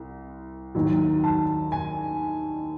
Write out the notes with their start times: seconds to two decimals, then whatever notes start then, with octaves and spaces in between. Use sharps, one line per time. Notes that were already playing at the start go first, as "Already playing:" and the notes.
Already playing: C2
0.75 D#2 D#3 F#3
1.24 A5
1.72 G#5